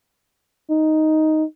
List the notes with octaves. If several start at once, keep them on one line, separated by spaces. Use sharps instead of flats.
D#4